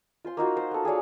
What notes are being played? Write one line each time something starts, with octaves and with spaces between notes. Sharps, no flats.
F4 C5 C6
A#3 D#4 F4 F#4
C5
B3 A4
G#4 C#5 D5 F5